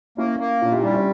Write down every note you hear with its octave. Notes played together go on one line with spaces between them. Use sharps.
A#3 C#4 E4
A#3
A#2 D4 F4
E4 G4
G3 D4 F4
C#4 E4